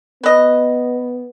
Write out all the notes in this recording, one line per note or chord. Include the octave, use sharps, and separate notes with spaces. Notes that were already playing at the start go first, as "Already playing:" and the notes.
B3 B4 D#5